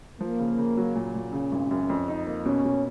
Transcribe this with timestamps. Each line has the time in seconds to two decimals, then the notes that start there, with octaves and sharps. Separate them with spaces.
0.20 F3 A#3
0.40 C#3
0.58 C#3
0.77 F#3
0.95 A#2
1.15 A#2
1.33 C#3 C#4
1.52 G#1
1.71 F#2
1.90 F2
2.08 D#4
2.27 A#3
2.45 B2 C#4
2.65 B2